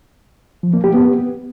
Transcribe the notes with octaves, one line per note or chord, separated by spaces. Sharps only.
F3
A#3
G4
B3